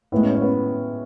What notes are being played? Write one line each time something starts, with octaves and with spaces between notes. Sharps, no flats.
A2 G#3 B3
C#4
C#4
B3